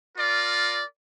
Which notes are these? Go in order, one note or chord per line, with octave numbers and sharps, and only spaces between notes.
F4 A#4 D5